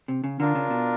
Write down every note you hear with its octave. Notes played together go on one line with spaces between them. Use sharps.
C3
C#3
D3 D4 F4 A#4
C#3
B2